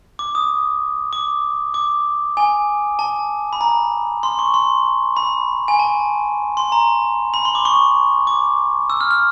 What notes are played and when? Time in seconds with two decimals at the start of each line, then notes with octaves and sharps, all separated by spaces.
0.19 D6
0.35 D#6
1.13 D6
1.74 D6
2.37 G#5
2.99 A5
3.53 B5
3.61 A#5
4.23 C6
4.39 C#6
4.54 C6
5.17 B5
5.68 G#5
5.79 A5
6.57 C6
6.72 A#5
7.34 B5
7.45 C6
7.55 D6
7.65 C#6
8.27 D6
8.90 E6
9.01 F6
9.11 F6